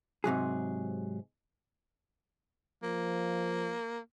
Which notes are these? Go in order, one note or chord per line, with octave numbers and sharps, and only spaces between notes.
G#2 C3 F#3 G#4
F3 A#3